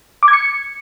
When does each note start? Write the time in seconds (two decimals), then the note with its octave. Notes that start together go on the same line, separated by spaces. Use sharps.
0.23 D6
0.28 G#6
0.33 C#7